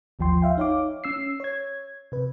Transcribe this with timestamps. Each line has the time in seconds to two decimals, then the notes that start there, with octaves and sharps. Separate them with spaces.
0.19 G#1 D#2 F3 G5 C6
0.42 E5 F5 G5
0.58 D#4 C#5 F5 D6
1.04 C#4 E6 C7
1.40 C#5 G#6
2.12 C3 B4